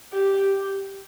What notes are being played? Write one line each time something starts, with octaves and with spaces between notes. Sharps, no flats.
G4